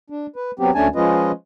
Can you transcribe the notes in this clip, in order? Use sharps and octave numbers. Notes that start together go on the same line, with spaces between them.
D4
B4
F#3 B3 C4 G4
D2 A3 C#4 D4 G#5 A5
F3 G#3 C#4 F4 B4 D#5